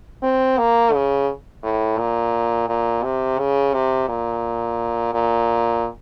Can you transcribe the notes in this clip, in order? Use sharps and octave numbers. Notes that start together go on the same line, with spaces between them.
C4
A#3
C#3
A2
A#2
A#2
C3
C#3
C3
A#2
A#2